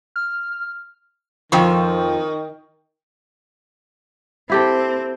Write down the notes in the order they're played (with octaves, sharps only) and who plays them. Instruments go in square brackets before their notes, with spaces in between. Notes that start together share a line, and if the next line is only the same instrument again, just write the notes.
[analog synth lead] F6
[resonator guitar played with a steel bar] F2 F3 [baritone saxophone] D#3 [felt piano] G5 C#6
[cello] C4 [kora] E4 G4 A4